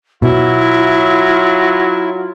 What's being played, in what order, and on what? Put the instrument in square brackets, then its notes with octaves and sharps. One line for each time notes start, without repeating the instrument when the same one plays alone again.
[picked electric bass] B2 [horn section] F#3 F4 [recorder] E4